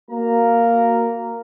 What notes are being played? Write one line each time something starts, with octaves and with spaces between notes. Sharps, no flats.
A#3 F#4 A#4 A#5